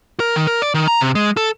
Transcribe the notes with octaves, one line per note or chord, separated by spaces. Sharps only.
A#4
D#3
A#4
D5
D#3
A#5
C3
G#3
A4